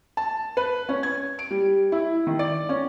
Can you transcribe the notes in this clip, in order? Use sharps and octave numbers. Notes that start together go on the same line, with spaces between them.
A5
B4
C#4
G#6
D7
G3
E4
D#3
D5
C#4